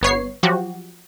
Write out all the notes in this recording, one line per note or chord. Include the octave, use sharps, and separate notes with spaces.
G1 B3 C#5 C7
F3 F#3 F#4 G4